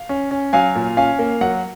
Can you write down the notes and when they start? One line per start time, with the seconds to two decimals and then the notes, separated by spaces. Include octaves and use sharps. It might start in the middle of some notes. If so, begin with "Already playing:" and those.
Already playing: F5
0.09 C#4
0.31 C#4
0.53 F#3 F5 G#5
0.75 A#2
0.97 C#4 F5 G#5
1.19 A#3
1.41 F#3 F#5